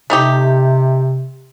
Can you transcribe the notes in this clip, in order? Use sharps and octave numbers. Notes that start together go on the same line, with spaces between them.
C3 A3 D#4 G4